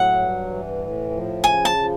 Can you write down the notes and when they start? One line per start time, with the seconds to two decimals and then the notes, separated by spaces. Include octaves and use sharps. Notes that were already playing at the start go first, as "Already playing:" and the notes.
Already playing: A2 F#3 F#5
0.13 G2
0.46 E3
0.78 A2
1.10 F3
1.43 C#3 G#5
1.65 A5
1.77 F3